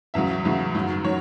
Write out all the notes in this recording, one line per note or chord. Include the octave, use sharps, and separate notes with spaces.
E2 C#3 F#3 E5
E2 C#3 F#3
F#2 D#3 F#3
D#3 F#3 C#5